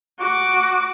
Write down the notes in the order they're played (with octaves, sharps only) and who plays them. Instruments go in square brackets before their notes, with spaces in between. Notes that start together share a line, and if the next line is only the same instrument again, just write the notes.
[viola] F#4 D6